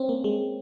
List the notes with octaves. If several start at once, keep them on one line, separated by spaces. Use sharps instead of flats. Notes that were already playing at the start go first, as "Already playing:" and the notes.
Already playing: C4 C#4
A#3
G#3